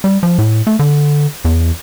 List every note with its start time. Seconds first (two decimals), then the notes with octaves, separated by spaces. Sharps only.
0.04 G3
0.23 F3
0.38 A2
0.67 A3
0.79 D3
1.45 E2